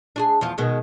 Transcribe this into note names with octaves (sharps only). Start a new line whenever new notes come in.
D4 F#4 G#4
E2 F3 F4
B2 D#3 G#3